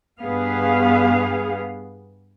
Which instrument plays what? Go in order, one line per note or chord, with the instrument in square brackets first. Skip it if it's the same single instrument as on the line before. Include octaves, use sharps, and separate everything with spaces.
[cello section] G2 B3 G#4 F5